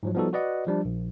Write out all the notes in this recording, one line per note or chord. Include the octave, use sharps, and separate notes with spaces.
G#2 F3 F#3
F3 G3 B3 D#4 F#4 A4
F#4 B4 D5 D#5 F#5
F3 G3 D4
A#1